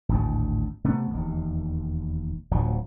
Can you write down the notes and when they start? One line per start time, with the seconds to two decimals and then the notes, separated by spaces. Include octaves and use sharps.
0.09 G#1 D2 A2
0.84 C3 A3 B3
1.10 E1 D#2
2.51 D1 D2 F3 F#3